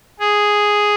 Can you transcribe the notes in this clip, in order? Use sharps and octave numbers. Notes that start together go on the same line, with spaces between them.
G#4